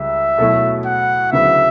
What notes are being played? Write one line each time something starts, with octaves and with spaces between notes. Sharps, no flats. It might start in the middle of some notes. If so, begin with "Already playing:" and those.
Already playing: C#2 G3 E5
B2 F#3 A3 E4
F#5
D2 C#3 F#3 B3 E4 E5